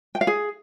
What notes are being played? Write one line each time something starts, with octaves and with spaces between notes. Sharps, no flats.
G5
F5
G#4